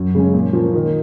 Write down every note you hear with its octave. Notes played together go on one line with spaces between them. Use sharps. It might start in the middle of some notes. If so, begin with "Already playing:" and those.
Already playing: F#2
C#3 G#3 C#4
A#2
F3 A#3 C#4
D#3